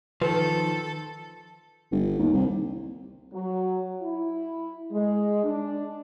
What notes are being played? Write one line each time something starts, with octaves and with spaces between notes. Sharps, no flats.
D#3 F3 A4 B4
G1
D#2
C2
F#3
E4
G#3
D4